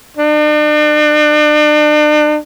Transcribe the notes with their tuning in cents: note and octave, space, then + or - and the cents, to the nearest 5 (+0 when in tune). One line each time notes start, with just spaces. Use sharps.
D4 +40